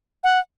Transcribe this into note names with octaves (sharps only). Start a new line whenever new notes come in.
F#5